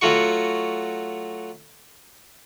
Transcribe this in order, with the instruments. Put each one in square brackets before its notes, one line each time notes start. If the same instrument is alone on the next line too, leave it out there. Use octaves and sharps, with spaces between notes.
[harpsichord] F#3 A3 F4 F#4 C#6